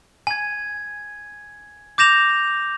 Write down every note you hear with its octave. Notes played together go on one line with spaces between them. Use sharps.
G#5 G#6
D6 G6 A#6 E7 F7